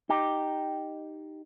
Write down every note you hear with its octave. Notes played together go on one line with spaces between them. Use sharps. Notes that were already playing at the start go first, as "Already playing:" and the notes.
D#4 G4